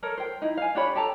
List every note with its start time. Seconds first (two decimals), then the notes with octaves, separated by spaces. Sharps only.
0.03 A4 A#4 C#5
0.18 C5 G5
0.42 D#4 E4
0.57 F5 G#5
0.75 D4 G4 C#5 B5
0.95 G4 A4 A5 A#5